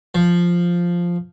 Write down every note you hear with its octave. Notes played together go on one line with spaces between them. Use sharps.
F3